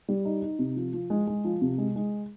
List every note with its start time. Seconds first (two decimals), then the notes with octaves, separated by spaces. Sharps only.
0.08 G3
0.25 D#4
0.42 D#4
0.59 C3
0.76 F3
0.93 F3
1.10 G#3
1.27 G#3
1.45 F3
1.62 C3
1.78 G#3
1.96 G#3